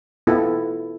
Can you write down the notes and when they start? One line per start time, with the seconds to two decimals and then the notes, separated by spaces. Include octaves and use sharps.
0.27 B3 E4 F4 A4